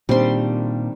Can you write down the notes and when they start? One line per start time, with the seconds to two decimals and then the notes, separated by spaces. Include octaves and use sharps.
0.09 A#2 D#3 G3 C4 D4 C6